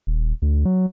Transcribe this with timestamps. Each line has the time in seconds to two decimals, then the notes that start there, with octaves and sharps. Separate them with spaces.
0.07 D#1
0.42 D2
0.65 F#3